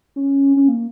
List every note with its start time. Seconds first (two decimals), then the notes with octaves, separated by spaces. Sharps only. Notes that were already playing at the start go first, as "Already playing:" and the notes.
0.16 C#4
0.57 C#4
0.68 A#3